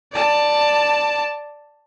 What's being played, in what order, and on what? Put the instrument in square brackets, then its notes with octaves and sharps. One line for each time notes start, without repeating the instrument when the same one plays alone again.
[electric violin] D5 A5